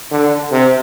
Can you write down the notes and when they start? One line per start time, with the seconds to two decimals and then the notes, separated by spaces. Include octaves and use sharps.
0.12 D3
0.52 C3